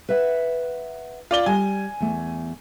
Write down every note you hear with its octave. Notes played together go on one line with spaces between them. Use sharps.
B4 E5 F#5
F4 D5 G7
G3 G#5
E2 A3